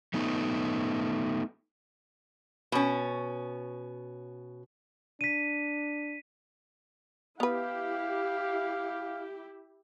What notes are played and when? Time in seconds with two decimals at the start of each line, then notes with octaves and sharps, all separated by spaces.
0.14 A3 B3 D#4
2.72 B2 C#4
5.21 D4 B6 D#7
7.40 B3 E4 G4 B4 F5